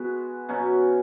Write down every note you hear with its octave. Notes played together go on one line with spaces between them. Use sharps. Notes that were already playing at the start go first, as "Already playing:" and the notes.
Already playing: G#3 B3 F#4 B4
B2 F#3 C#4